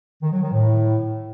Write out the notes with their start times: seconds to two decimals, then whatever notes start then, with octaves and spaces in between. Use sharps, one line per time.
0.22 D#3
0.32 F#3
0.42 D#3
0.51 A2